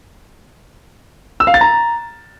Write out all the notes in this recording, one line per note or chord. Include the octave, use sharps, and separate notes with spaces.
E6
F5
A6
A#5